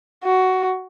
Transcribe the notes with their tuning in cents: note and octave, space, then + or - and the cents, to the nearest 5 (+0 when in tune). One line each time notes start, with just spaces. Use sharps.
F#4 +10